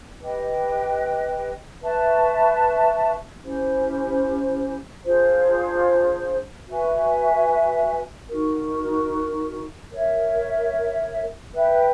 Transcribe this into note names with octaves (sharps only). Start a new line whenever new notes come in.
G4 B4 D#5 G5
B4 E5 A5 C#6
C#4 E4 G4 C5
D4 F4 G#4 C5
F#4 B4 E5 G#5
D#4 F#4 A#4
A#4 C#5 E5
B4 E5 G5